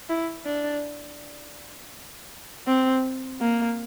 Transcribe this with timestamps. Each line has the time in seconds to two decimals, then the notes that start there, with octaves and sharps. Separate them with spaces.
0.09 E4
0.45 D4
2.67 C4
3.41 A#3